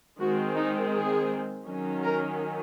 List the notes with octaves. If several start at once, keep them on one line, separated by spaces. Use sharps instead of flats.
D#3 G#3 C4 F#4
D#4
G#4
D#3 F#3 C#4
A#4